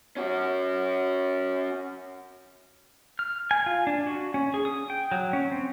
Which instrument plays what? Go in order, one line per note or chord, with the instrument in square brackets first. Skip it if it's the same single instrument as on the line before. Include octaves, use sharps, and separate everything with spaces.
[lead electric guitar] C#4 F#4
[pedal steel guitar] F6
G#5
F4
D4
F#4
C#4
G#4
D#6
G5
F#3
C#4
C4